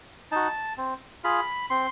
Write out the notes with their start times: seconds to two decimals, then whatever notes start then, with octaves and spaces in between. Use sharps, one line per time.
0.32 D#4 F#4 A5
0.78 C4
1.24 F4 G#4 B5
1.70 C4 C6